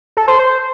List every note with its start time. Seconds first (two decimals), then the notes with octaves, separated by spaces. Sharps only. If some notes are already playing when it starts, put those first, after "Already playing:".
0.17 A4
0.28 C5
0.39 C5